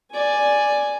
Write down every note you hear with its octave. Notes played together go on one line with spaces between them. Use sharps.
D5 G#5